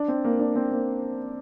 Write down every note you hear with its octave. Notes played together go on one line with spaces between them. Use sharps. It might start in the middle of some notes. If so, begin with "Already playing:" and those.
Already playing: D4
C4
A#3
D4
C4
A#3